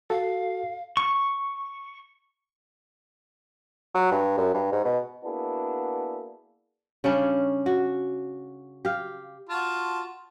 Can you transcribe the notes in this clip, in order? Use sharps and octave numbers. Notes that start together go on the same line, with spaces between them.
F#4 A4 F5
C#6
F#3
G2
F#2
G2
G#2
B2
A#3 B3 D4 E4 F#4 G#4
C#3 G3 C#4 D4
F#4
G4 F5
F4 F#4 A5